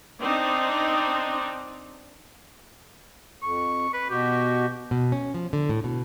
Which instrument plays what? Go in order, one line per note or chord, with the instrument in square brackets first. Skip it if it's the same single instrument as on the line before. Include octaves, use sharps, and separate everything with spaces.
[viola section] C4 D4 D#4
[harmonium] F2 [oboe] C#6
[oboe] B4
[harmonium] B2 F#4 [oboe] G4
[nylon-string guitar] B2
C#4
F3
D3
A2
B2